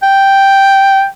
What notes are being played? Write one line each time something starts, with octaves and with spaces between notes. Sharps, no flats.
G5